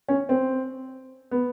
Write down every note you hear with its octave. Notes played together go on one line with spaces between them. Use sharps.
C#4
C4
B3